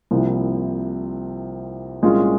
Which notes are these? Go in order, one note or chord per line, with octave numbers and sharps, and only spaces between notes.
C2 C3 F3 A#3 E4
C2 A#2 G#3 C#4 F4